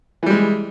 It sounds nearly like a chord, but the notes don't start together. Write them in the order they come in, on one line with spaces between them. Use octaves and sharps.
E3 G3 G#3